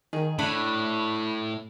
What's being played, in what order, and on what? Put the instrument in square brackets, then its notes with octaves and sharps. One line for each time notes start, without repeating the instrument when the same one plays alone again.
[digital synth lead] D#3 [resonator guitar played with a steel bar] G#4
[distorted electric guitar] A2 [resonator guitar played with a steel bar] D4 E4 [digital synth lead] B5